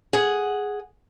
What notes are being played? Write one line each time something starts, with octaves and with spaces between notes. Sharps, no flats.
G#4 F#5